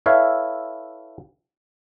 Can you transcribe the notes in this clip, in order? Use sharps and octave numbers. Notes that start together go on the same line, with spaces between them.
E4 A4 B4 C#5 E5 F5